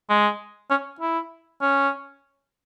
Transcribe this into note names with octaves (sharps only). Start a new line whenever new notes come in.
G#3
C#4
E4
C#4